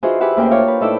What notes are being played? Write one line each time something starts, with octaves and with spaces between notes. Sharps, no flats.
E3 D#4 F4 F#4 G#4 C5
G4 G#4 B4 E5 F#5
D2 A#3 C#4 A#4 F5 G5
D4 F4 C5 C#5 F5
B4
A2 D#4 E4 A4 D5 E6